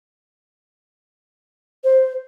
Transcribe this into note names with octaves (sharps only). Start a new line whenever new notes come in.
C5